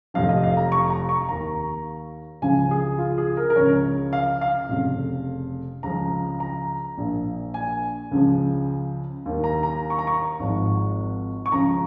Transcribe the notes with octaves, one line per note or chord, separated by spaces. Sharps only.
F1 F2 F3 F5
D#5
F5
A#5
C#6
A#5
C#6
D#2 D#3 A#5
C#2 C#3 F3 G#5
G#4
F4
G#4
A#4
A#4
C#2 C#3 F3 C#5
F5
F5
F1 F2 C#3
C#2 C#3 F3 A#5
A#5
A#1 A#2 F3
G#5
C#2 C#3 F3
D#2 D#3
A#5
A#5
C#6
A#5
C#6
G#1 G#2 F3
C#6
C#2 C#3 F3 A#5